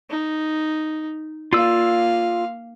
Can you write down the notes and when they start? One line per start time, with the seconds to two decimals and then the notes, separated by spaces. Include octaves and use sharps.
0.10 D#4
1.53 A#3 F4 D5 F5 E6